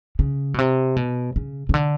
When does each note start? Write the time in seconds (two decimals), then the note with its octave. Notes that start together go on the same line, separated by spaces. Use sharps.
0.19 C#3
0.54 B2
0.59 C3
0.96 B2
1.36 C#3
1.69 C#3
1.74 D3